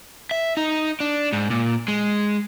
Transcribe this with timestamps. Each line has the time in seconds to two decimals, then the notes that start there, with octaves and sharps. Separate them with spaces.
0.31 E5
0.57 D#4
1.00 D4
1.33 G#2
1.50 A#2
1.88 G#3